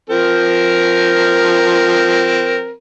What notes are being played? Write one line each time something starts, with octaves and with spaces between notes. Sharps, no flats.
F3 C4 A#4